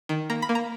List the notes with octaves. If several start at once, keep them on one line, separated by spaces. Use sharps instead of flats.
D#3
A#3 A#5
B5
A#3
A#5